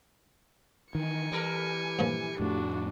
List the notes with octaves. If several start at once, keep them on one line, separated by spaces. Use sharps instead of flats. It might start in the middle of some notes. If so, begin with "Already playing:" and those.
D#3 E3 G#5 C#7
E3 G3 A4 A#4
G2 A#2 F3
F2 A2 A3 D4 F#4